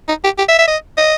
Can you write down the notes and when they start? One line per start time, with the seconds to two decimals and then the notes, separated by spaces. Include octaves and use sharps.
0.08 D#4
0.24 G4
0.38 G4
0.49 E5
0.59 E5
0.68 D#5
0.98 D#5